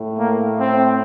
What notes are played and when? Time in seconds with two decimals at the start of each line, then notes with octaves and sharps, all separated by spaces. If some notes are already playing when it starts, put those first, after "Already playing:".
Already playing: A2
0.19 A#3
0.60 C4